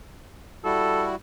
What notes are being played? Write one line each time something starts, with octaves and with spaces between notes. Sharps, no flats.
G3 E4 F#4 A4